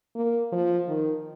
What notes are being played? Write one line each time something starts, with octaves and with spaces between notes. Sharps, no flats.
A#3
F3
D#3